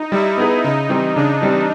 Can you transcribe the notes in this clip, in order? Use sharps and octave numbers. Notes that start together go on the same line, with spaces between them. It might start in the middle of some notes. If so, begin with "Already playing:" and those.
Already playing: D#4
G3 E4
B3 D#4 G#4 B4
C#3 D#4
E3 G3 C4
C#3 D4
E3 G3 C4